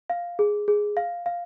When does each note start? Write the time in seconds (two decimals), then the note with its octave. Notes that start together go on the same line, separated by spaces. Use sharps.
0.10 F5
0.39 G#4
0.68 G#4
0.97 F5
1.26 F5